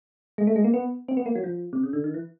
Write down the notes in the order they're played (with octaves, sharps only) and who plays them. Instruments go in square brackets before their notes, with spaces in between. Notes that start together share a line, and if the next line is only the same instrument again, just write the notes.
[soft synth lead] G#3
A3
G#3
A#3
B3
C4
B3
A#3
F#3
F3
C3
C#3
D3
D#3
E3